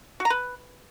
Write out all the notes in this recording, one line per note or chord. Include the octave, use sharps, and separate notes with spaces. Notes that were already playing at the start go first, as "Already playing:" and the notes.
F#4
A#5
B4